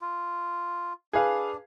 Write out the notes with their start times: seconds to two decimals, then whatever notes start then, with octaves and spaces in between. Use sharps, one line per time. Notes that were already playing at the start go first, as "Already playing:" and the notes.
0.01 F4
1.13 D4 G#4 B4 F5